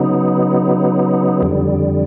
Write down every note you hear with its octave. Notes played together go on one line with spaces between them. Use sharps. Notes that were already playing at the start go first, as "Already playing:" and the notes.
Already playing: C#3 F#3 B3 D#4
F2 D3 G3